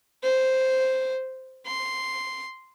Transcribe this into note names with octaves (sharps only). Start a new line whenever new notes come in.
C5
C6